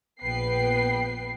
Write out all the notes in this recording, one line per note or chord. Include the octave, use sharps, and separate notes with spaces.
A#1 B3 B4 G5 C7